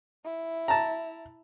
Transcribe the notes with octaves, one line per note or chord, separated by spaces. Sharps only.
E4
A5 A#5